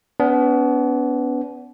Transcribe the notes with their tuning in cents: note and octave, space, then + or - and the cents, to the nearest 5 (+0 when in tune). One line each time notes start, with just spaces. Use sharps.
B3 +15 D4 -45